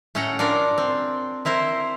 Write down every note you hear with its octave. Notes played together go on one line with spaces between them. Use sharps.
A2 C#4 A4 F#5 G5 A#5
D4 F4 A#4 D5
C4
C4 E4 A#4 C5